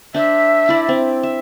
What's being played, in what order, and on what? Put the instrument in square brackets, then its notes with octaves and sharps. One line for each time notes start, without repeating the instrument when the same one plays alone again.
[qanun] D4 C5 [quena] E5
[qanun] E4 D5
C4
E5